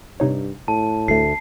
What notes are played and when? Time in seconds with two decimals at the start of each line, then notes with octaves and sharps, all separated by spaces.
0.20 G2 C3 D#4 C#5
0.68 A2 A5
1.08 D2 A3 C7